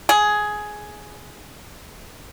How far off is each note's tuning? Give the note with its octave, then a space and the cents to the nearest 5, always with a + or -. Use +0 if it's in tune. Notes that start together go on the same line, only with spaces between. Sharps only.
G#4 +10